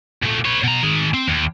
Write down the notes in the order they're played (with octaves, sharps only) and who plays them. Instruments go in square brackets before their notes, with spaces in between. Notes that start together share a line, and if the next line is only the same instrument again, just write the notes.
[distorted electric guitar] A#2 A3
B4 C#5
B2 A#5
D#3 G#4
C4
D#2